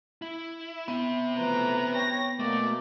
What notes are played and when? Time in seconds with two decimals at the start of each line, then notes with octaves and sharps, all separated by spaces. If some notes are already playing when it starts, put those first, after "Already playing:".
0.22 E4
0.88 B3 C4 E5
1.37 E3 F3 A3 B4 A#5
1.94 C#5 G5 A#6
2.40 B2 A3 A#3 D5